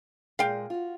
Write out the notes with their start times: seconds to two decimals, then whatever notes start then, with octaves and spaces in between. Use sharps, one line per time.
0.39 A#2 G#3 F5 G5
0.70 F4 F#4